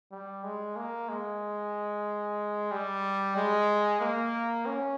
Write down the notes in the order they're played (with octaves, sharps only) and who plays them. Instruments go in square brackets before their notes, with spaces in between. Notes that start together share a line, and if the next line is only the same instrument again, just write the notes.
[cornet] G3
G#3
A#3
G#3
G3
G#3
A#3
C#4